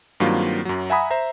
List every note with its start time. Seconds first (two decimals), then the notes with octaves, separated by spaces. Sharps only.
0.20 G2 D#3 F#3 A#3 C4 F4
0.65 F#2 F#3
0.90 E5 F#5 G#5 A#5 B5 D#6
1.10 C5 E5 A#5